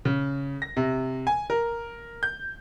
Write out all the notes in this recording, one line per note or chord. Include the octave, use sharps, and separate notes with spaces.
C#3
A#6
C3
G#5
A#4
G6